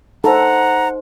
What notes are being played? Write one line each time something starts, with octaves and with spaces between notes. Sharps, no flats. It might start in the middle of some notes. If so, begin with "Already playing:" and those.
D#4 A4 C5 F#5 A#5